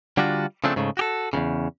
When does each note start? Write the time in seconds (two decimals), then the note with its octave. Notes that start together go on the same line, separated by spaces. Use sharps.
0.17 D3 G3 D4 F4 F#4
0.64 C#3 F3 A3 C4 D4
0.76 G#2 C#3 A3
0.97 F#4 G4 A4
1.33 E2 G#2 C#3